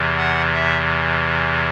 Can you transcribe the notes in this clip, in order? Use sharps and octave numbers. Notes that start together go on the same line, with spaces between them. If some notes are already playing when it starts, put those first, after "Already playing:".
Already playing: E2 C3 E3
F#5
E5